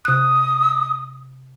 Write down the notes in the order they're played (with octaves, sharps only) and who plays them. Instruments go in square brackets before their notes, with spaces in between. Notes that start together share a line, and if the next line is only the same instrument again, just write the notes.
[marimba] C3 F#6 [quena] D#6